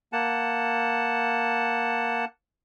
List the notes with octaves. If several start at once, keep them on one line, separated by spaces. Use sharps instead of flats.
A#3 F#5 A5